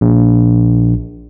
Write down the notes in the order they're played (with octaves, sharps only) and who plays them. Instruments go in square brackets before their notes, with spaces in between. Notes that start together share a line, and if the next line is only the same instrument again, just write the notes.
[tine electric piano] A#1